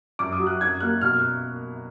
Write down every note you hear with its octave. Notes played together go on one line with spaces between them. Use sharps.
F#2 D6
D#6
F#3
F#6
F#2 G#6
A#3 F#6
B2 F6